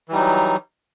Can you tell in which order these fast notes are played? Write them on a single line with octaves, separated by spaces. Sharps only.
E3 G3 D#4 F#3